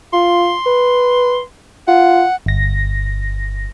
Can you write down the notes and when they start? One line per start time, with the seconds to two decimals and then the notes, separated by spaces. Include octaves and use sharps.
0.13 F4 C6
0.66 B4
1.88 F4 F#5
2.46 G1 A#6